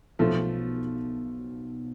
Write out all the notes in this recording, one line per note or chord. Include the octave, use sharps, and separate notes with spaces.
B1 B2 F3 A3 B3